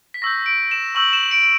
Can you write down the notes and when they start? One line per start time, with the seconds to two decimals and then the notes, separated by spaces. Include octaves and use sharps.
0.14 B6
0.22 C#6 E6 G6 A#6
0.46 D7
0.71 E7
0.95 C#6 E6 G6 F#7
1.13 E7
1.31 D7
1.42 D7